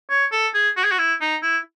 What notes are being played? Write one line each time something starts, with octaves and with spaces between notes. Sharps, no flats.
C#5
A4
G#4
F#4
G#4
F#4
E4
D#4
E4